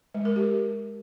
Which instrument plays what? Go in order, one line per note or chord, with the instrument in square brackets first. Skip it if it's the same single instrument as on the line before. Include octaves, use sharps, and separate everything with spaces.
[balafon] G#3
A#4
G4